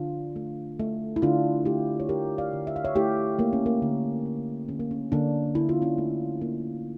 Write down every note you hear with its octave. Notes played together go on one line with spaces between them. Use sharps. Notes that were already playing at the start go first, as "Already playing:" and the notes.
Already playing: D3 D4 F4
A3
A3
E4
D3 D4 F4
A3 E4 G4
C#5
A3 G4 A#4
D5 F5
D3
E5
F5
C#5 E5
A3 E4 G4
A3 A#3
C#4
A#3
D3
D3
D3 C#4
A#3
C#4
D3 A#3 D4
D3 E4
F4
C#4 E4
A3
A#3